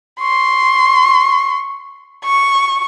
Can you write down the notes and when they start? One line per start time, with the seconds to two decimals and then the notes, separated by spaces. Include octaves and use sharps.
0.21 C6 C#6
2.24 C#6